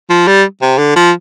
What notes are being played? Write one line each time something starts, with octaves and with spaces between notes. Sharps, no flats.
F3
G3
C3
D3
F3